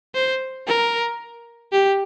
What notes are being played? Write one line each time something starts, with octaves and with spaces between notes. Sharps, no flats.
C5
A#4
G4